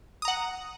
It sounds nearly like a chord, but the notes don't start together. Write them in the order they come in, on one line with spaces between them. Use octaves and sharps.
D#6 A#5 F#5